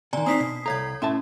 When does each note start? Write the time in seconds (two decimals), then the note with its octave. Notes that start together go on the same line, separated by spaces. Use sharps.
0.13 C3 D#3 D5 G#5 A#5
0.26 C4 D4 D#4 D#6 B6 C7
0.40 B2
0.66 C2 A4 C#5 F5 A#5 G#6
1.02 A2 C#4 E5 A5